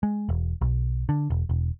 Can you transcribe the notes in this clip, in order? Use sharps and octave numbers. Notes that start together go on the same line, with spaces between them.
G#3
E1
B1
D3
E1
E1